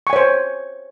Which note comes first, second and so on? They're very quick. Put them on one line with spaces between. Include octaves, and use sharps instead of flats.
C#6 G#5 C#5 C5